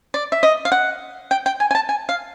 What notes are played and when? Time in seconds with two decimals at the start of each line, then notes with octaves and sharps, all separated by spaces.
0.14 D5
0.32 E5
0.43 D#5
0.65 F5
0.72 F#5
1.31 G5
1.46 G5
1.60 G#5
1.71 G#5
1.75 A5
1.89 G#5
2.09 F5